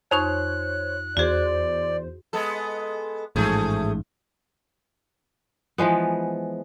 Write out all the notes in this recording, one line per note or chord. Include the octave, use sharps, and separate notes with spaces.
F2 D#4 C5 C#5 C#6 F#6
E2 F#4 G#4 C5 D5
G#3 B3 A4
A1 G#2 F3 A3 G#4
E3 F3 G#3 B3